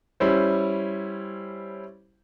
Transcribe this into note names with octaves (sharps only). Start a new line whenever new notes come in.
G3 C#4 E4 C5